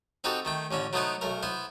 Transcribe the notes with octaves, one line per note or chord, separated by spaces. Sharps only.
C4 D#4 F#4 G4 A4
D#3 A3 G5
A1 D3 C#4 E5
F#3 A3 B3 D#4 C5 F#5
B1 A3 A#4
B3 E4 C5